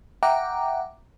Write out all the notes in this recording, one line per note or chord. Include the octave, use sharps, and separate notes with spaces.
E5 F#5 G5 A#5 D6